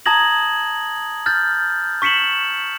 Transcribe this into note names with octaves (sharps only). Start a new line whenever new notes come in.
A5 A#5 D#6 G#6 A#6 F#7
F6 G6 A6
C#6 B6 C#7 E7 F#7